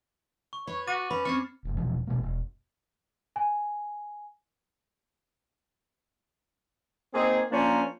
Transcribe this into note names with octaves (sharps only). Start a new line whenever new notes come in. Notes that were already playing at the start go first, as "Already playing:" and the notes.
C#6
B4 C#5
F#4 D6 A6 D#7
C#4 B4 B5
C4 C#4 C#6 F6 A6 C7
F1 F#2
E2 B2 E3 F3
A1 B2 G#3 A#3
E1
G#5
A#3 C4 D#4 G#4
F3 A#3 C#4 D4 A#4 C5